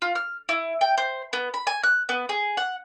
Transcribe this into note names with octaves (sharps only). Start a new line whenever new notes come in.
F4
F6
E4
G5
C5
B3
B5
G#5
F#6
B3
G#4
F#5